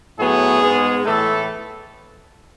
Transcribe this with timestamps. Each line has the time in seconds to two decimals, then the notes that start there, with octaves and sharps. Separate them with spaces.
0.19 A2 F#3 B3 G#4
0.62 G#2 G#3 B3
1.05 A2 E3 A3 A4